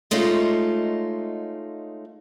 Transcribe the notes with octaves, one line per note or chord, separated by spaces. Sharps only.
G#3 A3 C#4 D#4 F4